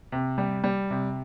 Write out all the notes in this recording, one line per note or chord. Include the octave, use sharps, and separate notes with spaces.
C3
G3
G3
C3